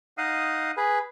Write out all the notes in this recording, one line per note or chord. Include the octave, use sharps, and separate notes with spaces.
D#4 D#5 F5 F#5 D#6
G#4 B4